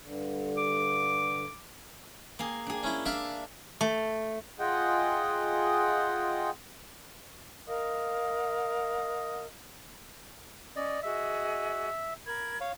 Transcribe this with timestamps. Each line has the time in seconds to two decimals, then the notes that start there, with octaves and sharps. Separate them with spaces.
0.03 G2 D3
0.58 D6
2.39 A#3 G#4
2.66 D4 G#4
2.83 C#4 E4
3.06 D4 E5 F5 A5
3.81 A3
4.59 F4 G#4 D#5 F#5 G5
7.68 A#4 D#5 F5
10.76 C#4 D5 D#5
11.03 F#4 G#4 D#5 E5
12.25 A#4 B5 G#6
12.61 C#5 F5